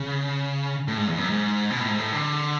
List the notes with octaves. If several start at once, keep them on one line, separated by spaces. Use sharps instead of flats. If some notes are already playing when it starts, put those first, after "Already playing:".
Already playing: C#3
A2
G#2
E2
F#2
G#2
B2
A2
G#2
A2
D3